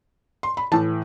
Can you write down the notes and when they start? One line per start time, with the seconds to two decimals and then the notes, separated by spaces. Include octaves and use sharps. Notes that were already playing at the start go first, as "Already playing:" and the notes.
0.43 C6
0.57 B5
0.72 A2 E3 A5